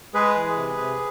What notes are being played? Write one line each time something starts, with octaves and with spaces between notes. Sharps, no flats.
G#3 G#4 B4
E3
C3
C3